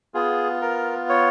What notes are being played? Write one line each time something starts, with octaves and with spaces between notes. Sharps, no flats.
B3 F4 G#4
A#4
C#5